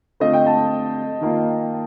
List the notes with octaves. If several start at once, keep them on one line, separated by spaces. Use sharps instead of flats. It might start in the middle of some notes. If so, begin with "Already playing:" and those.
D3 A3 C4 F4 D#5
G5
A5
D#3 A#3 F4